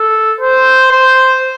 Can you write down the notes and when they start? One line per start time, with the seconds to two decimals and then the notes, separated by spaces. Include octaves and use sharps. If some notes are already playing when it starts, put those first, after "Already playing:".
Already playing: A4
0.41 C5
0.91 C5